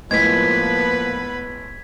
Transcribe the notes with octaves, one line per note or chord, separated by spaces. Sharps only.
A2 F3 G#3 A#3 B3 B4 G#6 B6